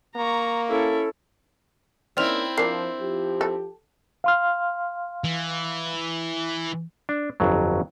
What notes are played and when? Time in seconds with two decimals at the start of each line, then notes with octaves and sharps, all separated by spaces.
0.16 A#3 A#5 C#6
0.69 C#4 E4 A4
2.17 A#3 C4 C#4 D#4 E4 D5 F6 F7
2.58 F3 D4 A#4 C7
2.99 F3 G4
3.41 A4
4.24 F5 C6 F6
5.24 E3
7.09 D4
7.40 G1 F2 F#3